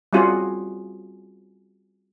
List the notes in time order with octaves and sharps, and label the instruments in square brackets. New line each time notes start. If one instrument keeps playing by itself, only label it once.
[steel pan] G3 C4 C#4 F4 F#4 G#4